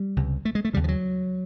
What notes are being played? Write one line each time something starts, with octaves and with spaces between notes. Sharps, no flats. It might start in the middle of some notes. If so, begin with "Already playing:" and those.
Already playing: G3
C#2 C3
A3
G#3
A3
D#2 C#3 G3
F3
F#3